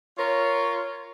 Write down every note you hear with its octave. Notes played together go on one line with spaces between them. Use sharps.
F4 A#4 C#5